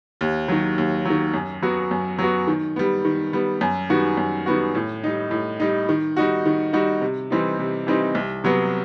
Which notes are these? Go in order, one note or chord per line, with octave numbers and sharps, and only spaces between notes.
D#2
D#3 F#3
D#2
D#3 F#3
F#2
F#3 B3 F#4
F#2
F#3 B3 F#4
D#3
G3 B3
D#3
G3 B3
F#2
D#3 G3 B3 F#4
F#2
D#3 G3 B3 F#4
A2
G3 D#4
A2
G3 D#4
D#3
G3 D#4 F#4
D#3
G3 D#4 F#4
C3
E3 G3 C4 D#4
C3
E3 G3 C4 D#4
C2
C3 F#3 B3